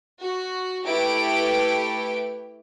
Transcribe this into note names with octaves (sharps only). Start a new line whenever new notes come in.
F#4
A3 E4 G4 B4 D7